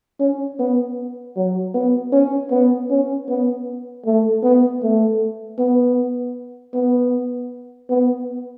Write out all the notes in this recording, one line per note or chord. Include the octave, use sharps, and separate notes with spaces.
C#4
B3
F#3
B3
C#4
B3
C#4
B3
A3
B3
A3
B3
B3
B3